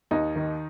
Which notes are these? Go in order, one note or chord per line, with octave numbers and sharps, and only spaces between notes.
D#2 D#4
D#3